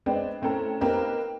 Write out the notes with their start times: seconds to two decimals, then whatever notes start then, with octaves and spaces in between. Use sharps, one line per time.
0.06 G#3 B3 C4 D4
0.42 A2 C4 C#4 A4 A#5
0.81 A#3 C4 D#4 G4 A#4 B4